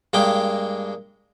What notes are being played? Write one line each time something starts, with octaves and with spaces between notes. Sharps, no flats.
G2 G#3 A#3 G5